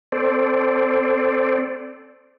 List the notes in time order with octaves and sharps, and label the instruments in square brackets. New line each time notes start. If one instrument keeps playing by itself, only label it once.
[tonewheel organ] C4 A4 C5 D5